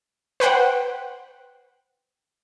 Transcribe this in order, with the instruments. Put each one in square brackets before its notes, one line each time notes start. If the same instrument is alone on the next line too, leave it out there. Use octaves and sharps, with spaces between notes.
[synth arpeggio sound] B4 C5 F#5 G5